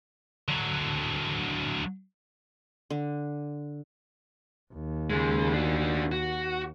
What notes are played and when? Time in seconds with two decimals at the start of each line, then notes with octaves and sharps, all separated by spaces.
0.48 D3 F#3
2.90 D3
4.73 D#2
5.10 C#2 G#3
5.54 D4 F#4
6.12 F#4